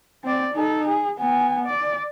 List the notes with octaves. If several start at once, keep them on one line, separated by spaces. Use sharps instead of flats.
C4 D5
D#4 A4
G#4
B3 G#5
D5